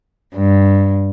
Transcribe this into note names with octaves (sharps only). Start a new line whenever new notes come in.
G2